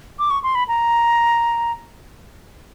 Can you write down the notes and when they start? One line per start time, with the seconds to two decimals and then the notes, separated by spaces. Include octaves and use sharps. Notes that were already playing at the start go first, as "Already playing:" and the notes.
0.19 D6
0.30 C#6
0.43 C6
0.55 B5
0.68 A#5